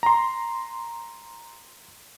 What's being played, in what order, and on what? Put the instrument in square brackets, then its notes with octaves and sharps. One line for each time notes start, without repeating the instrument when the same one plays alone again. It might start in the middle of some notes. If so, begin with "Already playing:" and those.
[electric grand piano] A#5 C6